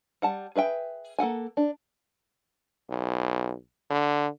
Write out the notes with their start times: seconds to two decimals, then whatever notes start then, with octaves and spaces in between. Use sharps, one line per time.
0.22 G3 F#5 A5
0.56 G#4 B4 E5 G5
1.19 A#3 A4 F#5 G#5
1.57 D4
2.90 B1
3.90 D3